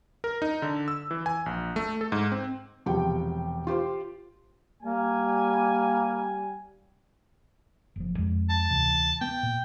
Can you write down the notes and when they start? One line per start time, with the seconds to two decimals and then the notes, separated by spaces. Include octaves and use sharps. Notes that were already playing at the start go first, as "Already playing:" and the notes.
0.24 A#4
0.42 D#4
0.62 D3
0.88 E6
1.11 E3
1.26 G#5
1.46 A#1
1.76 A3
2.01 A4
2.12 G#2
2.32 C4
2.86 E1 C3 F3 G4 F#5 G5
3.67 F4 G4 C5 C6
4.83 G3 A#3 G#5
7.96 F#1 F3
8.18 F2 G#3
8.50 A5
8.70 D2 C3 E3
9.21 B3 G5
9.43 A#2